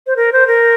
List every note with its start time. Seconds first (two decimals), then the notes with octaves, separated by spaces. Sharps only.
0.07 C5
0.16 A#4
0.33 C5
0.47 A#4